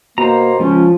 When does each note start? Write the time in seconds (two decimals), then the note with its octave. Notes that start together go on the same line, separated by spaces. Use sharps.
0.18 B2 A#3 C5 A#5
0.59 C#2 F3 C#4